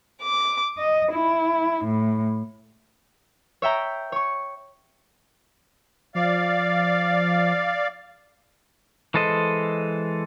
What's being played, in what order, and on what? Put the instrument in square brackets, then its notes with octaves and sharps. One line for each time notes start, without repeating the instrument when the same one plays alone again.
[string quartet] D6
D#5
E4
A2
[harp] C#5 E5 G5 A#5
C#5 C#6
[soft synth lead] F3 [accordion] D5 F5
[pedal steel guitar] E3 G#3 A4 C5 D#5